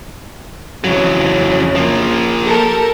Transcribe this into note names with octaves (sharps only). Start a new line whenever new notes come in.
F2 C#3 E3 F#3
F3 A#3
G4 A4 A#4